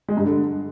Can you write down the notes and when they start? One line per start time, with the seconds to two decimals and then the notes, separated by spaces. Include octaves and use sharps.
0.08 G#3
0.17 G2
0.26 D3